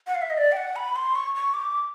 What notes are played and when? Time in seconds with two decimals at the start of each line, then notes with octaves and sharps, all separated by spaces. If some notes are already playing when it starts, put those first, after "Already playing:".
0.07 F#5
0.15 F5
0.22 E5
0.30 D#5
0.38 D5
0.52 G5
0.57 F#5
0.76 B5
0.96 C6
1.15 C#6
1.35 C#6
1.54 D6